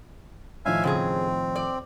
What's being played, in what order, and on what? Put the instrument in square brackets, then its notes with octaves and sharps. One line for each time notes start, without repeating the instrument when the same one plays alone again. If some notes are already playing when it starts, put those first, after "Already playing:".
[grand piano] A2 D#3 F3 [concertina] E5 F5 G#5
[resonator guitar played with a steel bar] C#3 A3 G#4 [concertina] C4
[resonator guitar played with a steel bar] D5